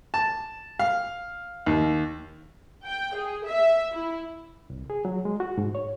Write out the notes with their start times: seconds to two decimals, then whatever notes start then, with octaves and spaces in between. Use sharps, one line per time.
0.14 A5
0.79 F5
1.66 D#2
2.85 G5
3.16 G#4
3.46 E5
3.92 E4
4.70 C2
4.90 G#4
5.05 F#3
5.25 G#3
5.40 F#4
5.58 G#2
5.75 C#5